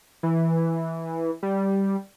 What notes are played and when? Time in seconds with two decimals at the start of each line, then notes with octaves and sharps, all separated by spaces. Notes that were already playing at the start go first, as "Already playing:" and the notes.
0.23 E3
1.43 G3